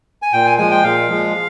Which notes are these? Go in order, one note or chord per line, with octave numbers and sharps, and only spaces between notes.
G#5
A#2 G5
G#5
F3 G#3 G#5
G5
A#2 F5
F3 G#3